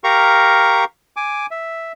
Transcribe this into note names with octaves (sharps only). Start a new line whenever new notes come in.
G4 A#4 F5 A#5 C#6
G#5 D6
E5